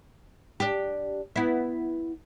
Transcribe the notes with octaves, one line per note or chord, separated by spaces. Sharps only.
D4 G4
B3 E4